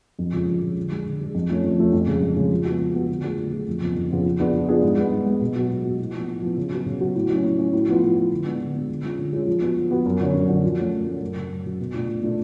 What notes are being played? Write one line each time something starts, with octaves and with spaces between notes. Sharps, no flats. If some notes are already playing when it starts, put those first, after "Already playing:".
F2
C#3 G#3 C#4 F4
F2
C#3 G#3 C#4 F4
D3
G#3 D4 G#4
D3
G#3 D4 G#4
F2
F3 A3 C#4
F2
F3 A3 C#4
F2
C#3 G#3
F2
C#3 G#3
F3
B3 F#4
F3
B3 F#4
D3
F#3 A3 F4 G#4
D3
F#3 A3 F4 G#4
F2
C#3 F3 B3 F4
F2
C#3 F3 B3 F4
F3
B3 D4 F4 G#4
F3
B3 D4 F4 G#4
G#2
G#3 B3
G#2
G#3 B3
B2
F#3 B3 F#4
B2
F#3 B3 F#4
A2
F3 B3
A2
F3 B3
C#3
F#3 B3 F#4
C#3
F#3 B3 F#4
A2
F#3 C#4
A2
F#3 C#4
A2
F3 B3 F4
A2
F3 B3 F4
D3
G#3 B3 D4
D3
G#3 B3 D4
D3
G#3 C#4 F4
D3
G#3 C#4 F4
F3
B3 F#4
F3
B3 F#4
F#2
D3 F#3 C#4
F#2
D3 F#3 C#4
F3
A3 C#4
F3
A3 C#4
F#2
C#3 F#3
F#2
C#3 F#3
B2
A3 D4 F4
B2
A3 D4 F4